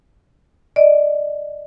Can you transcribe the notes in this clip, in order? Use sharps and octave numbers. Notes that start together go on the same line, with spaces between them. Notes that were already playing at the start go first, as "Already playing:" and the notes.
D5 D#5